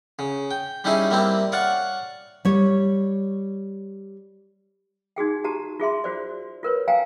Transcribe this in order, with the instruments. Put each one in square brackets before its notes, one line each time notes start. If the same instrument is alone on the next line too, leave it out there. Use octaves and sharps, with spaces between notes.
[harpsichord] C#3
G5
G3 C#4 D#4 E4 G#4
G3 A#3 C4 E4
C#5 D5 F5 F#5 C#6
[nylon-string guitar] G3 C#5
[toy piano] D#4 F#4 G#4 G5
F#4 G4 A5 A#5
F4 G#4 E5 C6
F4 F#4 C5 D5
F4 A#4 B4 C#5
F5 G5 G#5 A#5